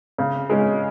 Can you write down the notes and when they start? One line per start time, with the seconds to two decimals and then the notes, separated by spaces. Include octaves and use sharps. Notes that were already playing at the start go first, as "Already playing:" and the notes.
0.18 C#3
0.49 G#3 C#4